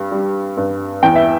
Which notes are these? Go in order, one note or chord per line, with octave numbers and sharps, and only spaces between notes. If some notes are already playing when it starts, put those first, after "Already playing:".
Already playing: G2 G3
G3
G2
E2 G5
E5